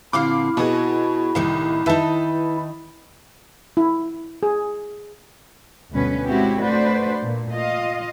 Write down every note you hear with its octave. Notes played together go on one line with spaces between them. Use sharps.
A#2 D3 C4 E4 F5 D6
B2 F#4 G#4 D#5
C2 A2 D#3 D#4
D#3 D#4 B4 E5 A5
E4
G#4
D2 G2 B2 C#4 B4
G#3 C4 C#4 E4 F#4 G4
A3 D4 F#4 B4 C5 D5
A#2 A3
F4 D#5 F5